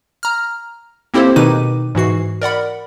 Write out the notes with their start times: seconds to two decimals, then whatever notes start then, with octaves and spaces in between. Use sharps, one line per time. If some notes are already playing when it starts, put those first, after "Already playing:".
0.23 A#5 F6
1.14 A#3 C4 E4 G4 A4 C5
1.36 B2 D#3 D#4 B4 D6 D#7
1.95 G#2 E3 F#4 C7
2.42 A#4 D5 F#5 B5